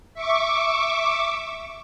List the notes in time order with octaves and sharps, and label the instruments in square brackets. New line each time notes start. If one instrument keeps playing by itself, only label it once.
[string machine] E5 C#6 D6